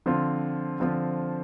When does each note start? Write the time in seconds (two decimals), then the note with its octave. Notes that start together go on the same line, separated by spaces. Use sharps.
0.06 D3 F3 C4 F4
0.80 D3 F3 C4 F4